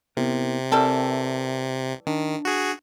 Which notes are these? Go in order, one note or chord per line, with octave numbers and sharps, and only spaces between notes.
C3 B3 E4 A#4
E3 G3 C4 A4 A#4
D#3 D4 A5
F#4 G#4